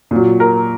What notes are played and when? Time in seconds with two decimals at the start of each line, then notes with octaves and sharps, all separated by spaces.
0.11 A#2 F#3
0.40 A#4